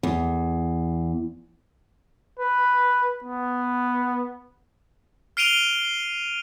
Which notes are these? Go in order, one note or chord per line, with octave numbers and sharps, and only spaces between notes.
E2
B4
B3
F6 C7 D7 D#7 F7 G7